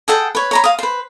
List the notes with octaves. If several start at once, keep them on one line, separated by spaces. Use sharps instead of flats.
G#4 A4 F#5 G5
B4 C#5
C#5 A#5 B5
F5 D#6
B4 C5